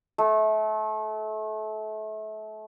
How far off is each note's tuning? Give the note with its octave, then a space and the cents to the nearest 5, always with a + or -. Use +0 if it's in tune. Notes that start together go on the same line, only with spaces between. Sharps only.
A3 -30